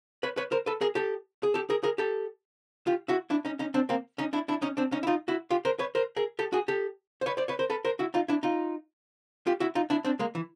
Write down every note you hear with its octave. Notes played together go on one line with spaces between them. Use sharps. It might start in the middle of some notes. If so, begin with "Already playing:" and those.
B4 C#5
B4 C#5
A#4 C5
A4 B4
G#4 A#4
G4 A4
G#4
G4 A4
G#4 A#4
G#4 A#4
G4 A4
F4 G4
E4 F#4
D4 E4
C#4 D#4
C#4 D#4
C4 D4
A#3 C4
C#4 D#4
D4 E4
D4 E4
C#4 D#4
C4 D4
C#4 D#4
E4
D#4 F4
E4 F#4
F4 G4
A#4 C5
B4 C#5
A#4 C5
G#4 A#4
G4 A4
F#4 G#4
G4 A4
C5
B4 C#5
C5 D5
B4 C#5
A#4 C5
A4 B4
A#4 C5
E4 F#4
D#4 F4
D4 E4
D#4 F4
F4 G4
E4 F#4
D#4 F4
D4 E4
C4 D4
G#3 A#3
E3